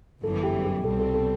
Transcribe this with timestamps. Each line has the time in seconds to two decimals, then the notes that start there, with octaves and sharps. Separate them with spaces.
0.23 G1 F#2 E3 A4
0.43 G4
0.64 G4
0.84 C2 B2 G3 C4 A4
0.99 A4
1.14 A4